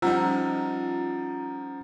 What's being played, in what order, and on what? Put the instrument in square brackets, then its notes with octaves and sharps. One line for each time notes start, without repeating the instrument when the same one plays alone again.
[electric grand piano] F3 G3 D#4 [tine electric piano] C#4 F#5 E6 [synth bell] F4 A#5